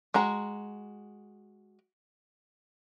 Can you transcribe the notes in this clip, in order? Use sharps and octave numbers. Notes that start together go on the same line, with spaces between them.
G#3 F#4 A#5